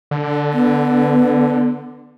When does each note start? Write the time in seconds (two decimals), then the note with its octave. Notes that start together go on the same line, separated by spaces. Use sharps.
0.11 D3
0.54 B3